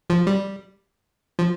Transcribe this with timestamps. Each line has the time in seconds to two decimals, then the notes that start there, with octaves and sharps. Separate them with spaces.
0.10 F3
0.27 G3
1.39 F3